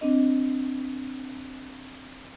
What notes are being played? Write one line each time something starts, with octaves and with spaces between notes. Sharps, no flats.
C4 D4 D#5